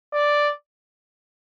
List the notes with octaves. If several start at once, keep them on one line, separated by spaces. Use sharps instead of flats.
D5